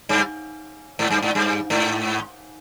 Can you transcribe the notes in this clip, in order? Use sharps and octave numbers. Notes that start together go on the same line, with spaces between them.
G2
G#2
G2
G#2
G2
G#2